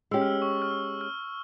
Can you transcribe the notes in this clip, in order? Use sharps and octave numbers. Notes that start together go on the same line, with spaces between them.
G#3 C#4 G4 E6
F6
E6
C#6
F6
E6
F6